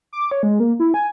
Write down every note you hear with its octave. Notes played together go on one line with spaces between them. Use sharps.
D6
C#5
G#3
A#3
E4
G#5